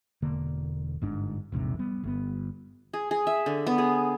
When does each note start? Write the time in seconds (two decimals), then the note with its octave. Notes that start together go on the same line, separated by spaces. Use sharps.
0.22 E1 D3 A#3
1.02 G1 G#2 D4
1.52 E1 A#1 G#2 C3
1.79 G3 B3
2.04 G1 B3
2.94 G#4
3.11 G#4
3.27 E5
3.46 D3
3.67 B3
3.78 G#4